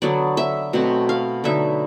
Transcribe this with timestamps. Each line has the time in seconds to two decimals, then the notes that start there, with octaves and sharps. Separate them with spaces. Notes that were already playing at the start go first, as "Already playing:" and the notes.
0.02 D3 F#3 B3 D5
0.37 E5
0.73 B2 F#3 A3 C4
1.09 F5
1.44 D3 F#3 B3 D#4 E5